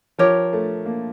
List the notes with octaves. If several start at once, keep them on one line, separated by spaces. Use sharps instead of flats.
F3 G4 A#4 C#5
A3
A#3